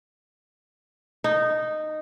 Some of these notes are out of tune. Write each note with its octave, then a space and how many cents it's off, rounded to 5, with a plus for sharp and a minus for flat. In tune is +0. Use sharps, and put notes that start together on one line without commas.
D#4 -10